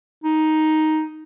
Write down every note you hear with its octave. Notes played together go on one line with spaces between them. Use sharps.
D#4